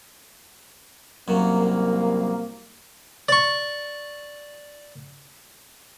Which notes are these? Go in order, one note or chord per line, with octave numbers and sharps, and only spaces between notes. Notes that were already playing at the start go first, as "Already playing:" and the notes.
C2 F#2 F#3 A#3
D5 C#6